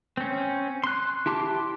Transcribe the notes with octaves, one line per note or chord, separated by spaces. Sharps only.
C4 C#4
C6 F#6
E4 G4 A5 C6 D6